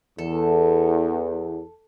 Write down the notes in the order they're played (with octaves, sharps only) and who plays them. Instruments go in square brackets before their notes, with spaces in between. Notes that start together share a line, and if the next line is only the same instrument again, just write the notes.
[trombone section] E2 [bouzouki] A4